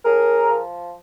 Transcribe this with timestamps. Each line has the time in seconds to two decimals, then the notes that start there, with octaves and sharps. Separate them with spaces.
0.05 A2 G#4 A#4
0.49 F3